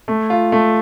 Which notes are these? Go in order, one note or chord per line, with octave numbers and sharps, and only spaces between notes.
A3
F4
A3